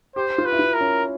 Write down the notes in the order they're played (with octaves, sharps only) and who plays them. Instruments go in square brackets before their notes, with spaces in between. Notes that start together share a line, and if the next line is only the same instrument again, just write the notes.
[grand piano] G4 [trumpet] C5
[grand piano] F4
[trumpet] B4
[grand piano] E4
F4
[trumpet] A#4
[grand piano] C#4